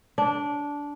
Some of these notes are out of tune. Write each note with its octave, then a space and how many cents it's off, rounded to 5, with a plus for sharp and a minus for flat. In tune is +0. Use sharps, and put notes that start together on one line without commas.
D4 -15